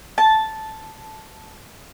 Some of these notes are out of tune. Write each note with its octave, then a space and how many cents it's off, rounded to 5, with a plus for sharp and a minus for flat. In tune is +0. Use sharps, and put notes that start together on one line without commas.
A5 -5